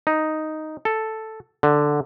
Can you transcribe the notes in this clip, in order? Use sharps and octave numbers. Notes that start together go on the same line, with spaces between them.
D#4
A4
D3